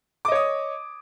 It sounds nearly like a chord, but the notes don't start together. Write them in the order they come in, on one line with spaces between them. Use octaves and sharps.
D6 D#5 C#5 D#6